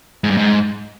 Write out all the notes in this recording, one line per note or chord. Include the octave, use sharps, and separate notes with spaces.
G#2
G2
G#2